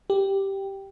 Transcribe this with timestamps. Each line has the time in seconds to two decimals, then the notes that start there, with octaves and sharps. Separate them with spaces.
0.10 G4